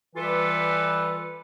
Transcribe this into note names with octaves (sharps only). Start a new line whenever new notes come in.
E3 G3 F4 A4 B4